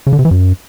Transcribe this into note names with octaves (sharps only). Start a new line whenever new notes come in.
C#3
D3
C3
E3
F#2